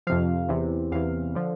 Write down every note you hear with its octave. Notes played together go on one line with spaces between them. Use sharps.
F2 C3 F3 F5
E2 C3 E3
E2 C3 E3 F5
D3 F3